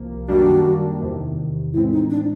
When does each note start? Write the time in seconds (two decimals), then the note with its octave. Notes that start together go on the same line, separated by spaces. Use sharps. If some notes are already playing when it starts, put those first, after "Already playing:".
Already playing: C2 C3 F3 A#3
0.28 F#2 D#3 G3 A#3 D4 F#4
1.01 E2 C3 D#3
1.73 A2 E3 G#3 C4 E4
1.92 D#4
2.10 D4